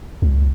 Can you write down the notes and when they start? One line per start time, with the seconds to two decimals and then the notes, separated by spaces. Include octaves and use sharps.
0.22 C#2